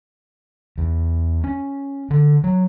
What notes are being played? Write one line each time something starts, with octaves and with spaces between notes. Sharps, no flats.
E2
C#4
D3
F#3